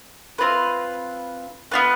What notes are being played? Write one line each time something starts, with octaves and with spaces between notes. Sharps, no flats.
C4 F4 B4
B3 F4 B4